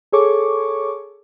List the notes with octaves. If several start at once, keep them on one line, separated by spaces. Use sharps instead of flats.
G#4 A4 C#5 C#6 D6